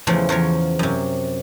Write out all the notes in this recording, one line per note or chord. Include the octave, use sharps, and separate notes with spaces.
E2 C#3 E3 F3 A3
E2 F3 A#4 C#5
F#2 C3